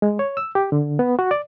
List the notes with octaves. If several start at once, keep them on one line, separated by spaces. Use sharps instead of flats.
G#3
C#5
E6
G4
D3
B3
F#4
D5